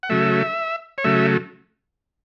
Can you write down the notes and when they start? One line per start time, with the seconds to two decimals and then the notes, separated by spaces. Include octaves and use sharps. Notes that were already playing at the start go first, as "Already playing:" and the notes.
0.03 F#5
0.10 C#3 F#3 A3 E5
0.98 C#5
1.04 C#3 F#3 A3 E5